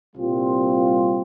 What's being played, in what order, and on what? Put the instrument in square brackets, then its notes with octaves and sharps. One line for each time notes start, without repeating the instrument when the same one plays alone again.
[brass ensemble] C2 A#2 G3 C4 F4